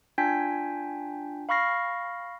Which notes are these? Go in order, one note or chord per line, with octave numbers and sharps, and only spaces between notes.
D4 F4 G5 G#5 G6 B6
F5 B5 C#6 F6 A#6 C7